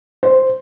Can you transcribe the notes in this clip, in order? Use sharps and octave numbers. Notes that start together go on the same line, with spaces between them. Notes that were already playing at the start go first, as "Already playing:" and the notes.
C5